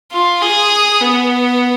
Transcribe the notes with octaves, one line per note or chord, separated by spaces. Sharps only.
F4
G#4
B3